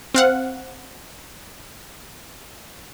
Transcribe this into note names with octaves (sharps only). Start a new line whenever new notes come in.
C4 F5 F#5